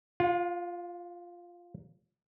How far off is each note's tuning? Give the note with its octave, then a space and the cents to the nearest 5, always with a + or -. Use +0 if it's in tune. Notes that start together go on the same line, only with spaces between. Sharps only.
F4 +0 F5 +45